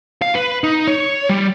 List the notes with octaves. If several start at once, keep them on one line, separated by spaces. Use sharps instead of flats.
F5
B4
D#4
C#5
G3